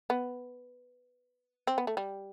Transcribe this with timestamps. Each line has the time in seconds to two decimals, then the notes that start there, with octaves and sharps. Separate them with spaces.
0.10 B3
1.67 C4
1.78 B3
1.87 A3
1.97 G3